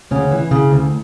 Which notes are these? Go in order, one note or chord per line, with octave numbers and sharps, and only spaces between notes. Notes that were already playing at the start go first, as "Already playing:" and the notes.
D2 C#3 C#4
E3
C#3
D2